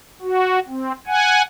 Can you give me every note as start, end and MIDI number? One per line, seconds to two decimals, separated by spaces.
0.22 0.59 66
0.67 0.92 60
1.07 1.42 78
1.07 1.42 80